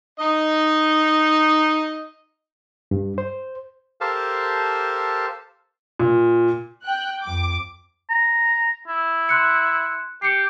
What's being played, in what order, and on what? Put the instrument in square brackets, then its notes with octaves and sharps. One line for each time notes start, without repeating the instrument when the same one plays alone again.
[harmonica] D#4 D#5
[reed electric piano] G2
C5
[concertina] G4 A4 A#4 C5 F5 A5
[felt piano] A#2
[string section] G5 F#6
F2 D6
[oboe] A#5
E4
[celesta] C6 F#6 C#7
[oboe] G4 [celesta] C7 C#7